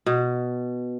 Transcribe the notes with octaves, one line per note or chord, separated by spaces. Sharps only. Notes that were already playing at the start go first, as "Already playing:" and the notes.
B2